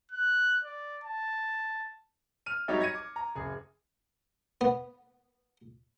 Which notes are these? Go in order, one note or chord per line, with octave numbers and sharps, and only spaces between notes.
F#6
D5
A5
F6 D#7
F#3 G3 D#4 G4 C#5 E5
G#6 A#6 C#7 D#7
D6
A#5
F#1 G#4
B3